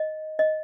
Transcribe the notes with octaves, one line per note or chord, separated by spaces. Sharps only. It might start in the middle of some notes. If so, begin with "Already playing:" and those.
Already playing: D#5
D#5